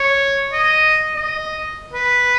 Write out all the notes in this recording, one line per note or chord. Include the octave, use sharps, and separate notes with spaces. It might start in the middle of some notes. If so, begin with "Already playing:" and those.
Already playing: C#5
D#5
D#5
B4